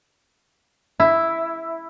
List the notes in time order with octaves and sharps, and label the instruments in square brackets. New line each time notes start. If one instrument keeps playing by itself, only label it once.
[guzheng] E4